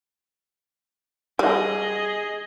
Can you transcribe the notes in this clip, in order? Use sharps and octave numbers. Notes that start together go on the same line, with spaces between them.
G3 G#4 D#5